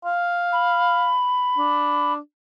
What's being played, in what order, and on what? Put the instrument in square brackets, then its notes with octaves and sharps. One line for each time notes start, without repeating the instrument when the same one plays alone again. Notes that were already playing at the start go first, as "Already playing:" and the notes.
[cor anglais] F5
[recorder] B5
[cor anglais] D4